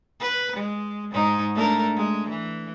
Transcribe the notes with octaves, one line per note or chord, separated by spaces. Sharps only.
B4
G#3
G#2 G#3 D#4
A3 D4 A#4
G#3
E3